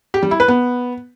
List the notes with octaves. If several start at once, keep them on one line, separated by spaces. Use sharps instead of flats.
G4
G3
E4
B4
B3